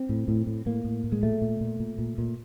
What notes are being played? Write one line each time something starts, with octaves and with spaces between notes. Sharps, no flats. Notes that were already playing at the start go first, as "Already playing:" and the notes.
Already playing: C4
A2
A2
A2
A2 A#3
A2
A2
G#3
A#2 A3
A#2
A#2
A#2
A#2
A#2